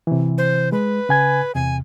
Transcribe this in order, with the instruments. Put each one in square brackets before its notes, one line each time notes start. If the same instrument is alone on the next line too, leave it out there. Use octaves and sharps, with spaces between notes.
[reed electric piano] C3 E3
[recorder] C5
[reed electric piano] G#3 [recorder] B4
[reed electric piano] C#3 G#5 G#6
[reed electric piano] E2 C3 [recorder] G#5